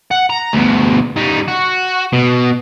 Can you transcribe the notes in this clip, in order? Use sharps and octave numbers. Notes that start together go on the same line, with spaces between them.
F#5
A#5
D2 B2
G3 D#4
F#4
B2